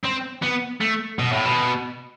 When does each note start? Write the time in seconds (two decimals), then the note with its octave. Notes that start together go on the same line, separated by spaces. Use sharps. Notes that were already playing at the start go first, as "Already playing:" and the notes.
0.05 C4
0.43 B3
0.81 A3
1.19 B2
1.33 A2
1.45 B2